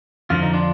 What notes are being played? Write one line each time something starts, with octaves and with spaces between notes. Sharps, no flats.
F2 D3 F3 F4
D#4
D4 F4